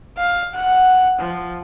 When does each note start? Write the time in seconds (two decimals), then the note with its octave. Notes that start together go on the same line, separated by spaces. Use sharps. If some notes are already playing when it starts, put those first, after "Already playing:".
0.18 F5
0.54 F#5
1.19 F3